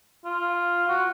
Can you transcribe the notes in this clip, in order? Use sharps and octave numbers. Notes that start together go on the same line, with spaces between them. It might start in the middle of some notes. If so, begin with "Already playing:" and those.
F4
F#4